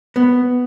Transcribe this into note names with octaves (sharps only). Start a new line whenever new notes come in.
B3